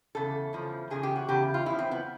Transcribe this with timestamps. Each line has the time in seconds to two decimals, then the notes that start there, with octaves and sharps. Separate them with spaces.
0.15 E2 C#3 A4
0.53 E2 C#3 F3
0.90 E2 C#3 F3 G#4
1.03 G4
1.16 F#4
1.29 E2 C#3 G4
1.54 F4
1.66 E2 C#3 F3 E4
1.79 C4
1.91 B3